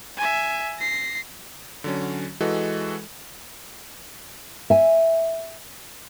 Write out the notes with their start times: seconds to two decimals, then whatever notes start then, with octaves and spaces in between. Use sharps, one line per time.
0.17 E5 G#5
0.79 A#6 C7
1.84 D3 F#3 C#4
2.40 E3 G#3 F#4 A4 D#5
4.70 E5 G#5